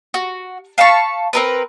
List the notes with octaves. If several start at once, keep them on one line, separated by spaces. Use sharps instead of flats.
F#4
F5 A5 B5 C#6
C4 A#4 B4